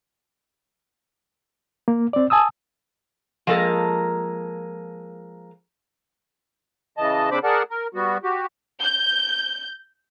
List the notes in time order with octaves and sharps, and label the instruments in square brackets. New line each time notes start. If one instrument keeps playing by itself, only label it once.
[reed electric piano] A#3
C4 D5
G#5 A5 D#6 E6
[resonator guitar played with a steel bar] F3 G#3 A#3 A4 A#4
[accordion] C#3 E3 D#5 A5
C#3 C4 D4 C5 B5 D6
G#4 A#4 D5 F#5 A5
A#4
G3 B3 F#4
F#4 G4
[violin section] G6